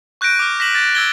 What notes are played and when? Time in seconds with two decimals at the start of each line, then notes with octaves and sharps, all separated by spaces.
0.21 C#6 F#6 G6 A#6 D7
0.39 D6 F6
0.60 A#6 B6 E7 F#7
0.75 G6 A6
0.95 E6 G#6 G7